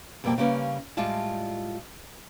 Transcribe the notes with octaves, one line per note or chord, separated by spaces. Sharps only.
F2 B2 G3 A#3 D5 G5
C#3 G3 A#3 C#4 B4
A2 G3 G#3 F4 D5 A5